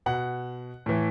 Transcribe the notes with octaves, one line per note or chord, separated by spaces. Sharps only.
B2 F#5
A2 E3